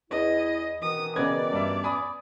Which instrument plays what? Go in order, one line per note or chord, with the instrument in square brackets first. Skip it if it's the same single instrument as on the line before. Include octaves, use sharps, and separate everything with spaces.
[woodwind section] E2 E4 [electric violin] D#5
[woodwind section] B2 D#3 E3 [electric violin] D#6
[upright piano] C#3 D#5 G#6 [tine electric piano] B3 C#4 B4 [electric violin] D5
[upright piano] G2 E5
G#5 B5 D#6